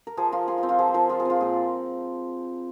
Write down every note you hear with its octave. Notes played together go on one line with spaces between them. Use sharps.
A#4
F3 G#4
F3 F4
F4 G#4
C4 F4
F4
F3 G#4
C5
F3 A#4
F4 G#4
G#4
C4 F4
A#2 G#4